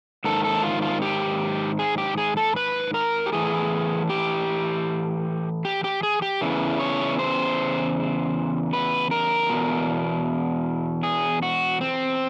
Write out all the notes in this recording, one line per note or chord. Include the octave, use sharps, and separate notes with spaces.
G#2 D#3 A4
A4
F4
F4
G4
G#4
G4
G#4
A4
B4
A#4
G4
A2 E3 G#4
G4
G4
G4
G#4
G4
E2 C#3 E3
C#5
C5
B4
A#4
E2 B2
G#4
F#4
C4